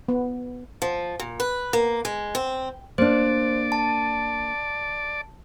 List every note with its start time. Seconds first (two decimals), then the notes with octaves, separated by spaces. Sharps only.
0.08 B3
0.82 F3
1.20 A#2
1.40 B4
1.73 A#3
2.05 G#3
2.35 C4
2.98 A#3 D4 C5 D5
3.72 A5